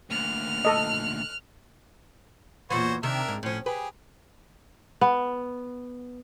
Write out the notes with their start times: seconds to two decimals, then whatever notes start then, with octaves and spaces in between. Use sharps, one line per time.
0.10 D2 A#2 F6 F#6
0.65 A4 D#5
2.70 E2 A#2 E3 F#4 C5 C#5
3.03 C3 D#3 D4 A#4 E5
3.28 G#2
3.43 A2 F3 C#4
3.66 G4 G#4 B4
5.01 B3